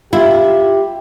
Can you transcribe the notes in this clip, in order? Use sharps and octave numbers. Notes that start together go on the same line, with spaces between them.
E4 F4 G4